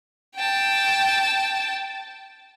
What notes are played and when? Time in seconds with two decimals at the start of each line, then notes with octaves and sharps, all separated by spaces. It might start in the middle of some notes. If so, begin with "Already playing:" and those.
0.35 G5 A5